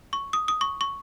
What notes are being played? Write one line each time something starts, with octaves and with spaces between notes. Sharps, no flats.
C#6
D#6
D#6
C#6
C#6